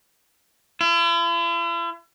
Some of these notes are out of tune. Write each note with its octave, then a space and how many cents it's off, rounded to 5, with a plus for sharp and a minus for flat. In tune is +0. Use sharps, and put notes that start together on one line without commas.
E4 +45